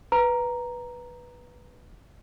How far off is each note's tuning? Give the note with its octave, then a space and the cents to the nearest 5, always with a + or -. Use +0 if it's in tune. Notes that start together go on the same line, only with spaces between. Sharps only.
B4 -5 A#5 +0